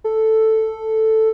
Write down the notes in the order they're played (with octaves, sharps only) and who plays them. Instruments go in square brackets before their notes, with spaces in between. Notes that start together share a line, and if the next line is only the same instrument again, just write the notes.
[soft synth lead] A4